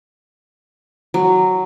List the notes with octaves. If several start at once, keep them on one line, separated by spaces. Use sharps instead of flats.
F#3